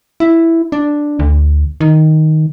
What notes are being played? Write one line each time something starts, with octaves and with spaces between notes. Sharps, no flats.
E4
D4
D2
D#3